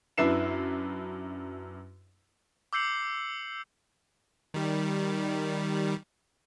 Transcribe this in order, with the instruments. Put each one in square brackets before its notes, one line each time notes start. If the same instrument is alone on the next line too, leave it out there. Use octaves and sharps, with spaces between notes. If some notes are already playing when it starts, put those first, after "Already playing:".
[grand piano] F#2 D4 E4 B4 C7 E7
[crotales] D6 E6 G6 C7 C#7 F#7
[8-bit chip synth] D#3 G3